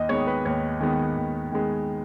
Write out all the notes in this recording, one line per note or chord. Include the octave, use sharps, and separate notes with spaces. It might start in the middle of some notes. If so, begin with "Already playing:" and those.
Already playing: D#2 D#5
D#3 G#3 B3 C#5
B4
D#2 C#5
D#3 G#3 B3
D#2
D#3 G#3 B3